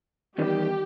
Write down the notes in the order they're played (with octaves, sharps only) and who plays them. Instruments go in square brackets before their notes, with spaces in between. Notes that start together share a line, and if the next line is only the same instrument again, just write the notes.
[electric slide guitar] E2 D#3 G3 [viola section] G4